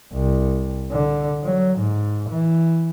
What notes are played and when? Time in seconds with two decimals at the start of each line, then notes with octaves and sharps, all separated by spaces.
0.12 C2
0.91 D3
1.44 F#3
1.79 G#2
2.30 E3